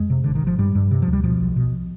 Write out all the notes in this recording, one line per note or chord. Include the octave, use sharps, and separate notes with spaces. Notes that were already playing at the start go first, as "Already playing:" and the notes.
Already playing: F2 G#3
C3
G#1 D3
D#3
G#1 F3
G2 G3
G2
C3
F3
D2
G3
B2 F3
B1
B2